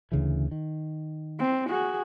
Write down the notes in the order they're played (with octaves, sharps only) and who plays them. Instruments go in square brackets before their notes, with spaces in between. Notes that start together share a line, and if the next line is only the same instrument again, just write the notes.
[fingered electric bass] D2 C#3 E3
D#3
[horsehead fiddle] C4
F#4 G#4